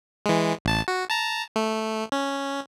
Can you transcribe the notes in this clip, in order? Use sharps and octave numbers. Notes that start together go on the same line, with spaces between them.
E3 G#3
A1 A5
F#4
A5 A#5
A3
C#4